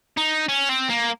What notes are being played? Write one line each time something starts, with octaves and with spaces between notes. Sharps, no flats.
D#4
C#4
C4
A#3